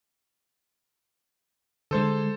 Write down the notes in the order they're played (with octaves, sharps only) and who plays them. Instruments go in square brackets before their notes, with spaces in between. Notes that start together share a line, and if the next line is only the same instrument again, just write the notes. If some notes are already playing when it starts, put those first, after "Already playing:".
[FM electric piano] D3 G#3 [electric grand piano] A4 C5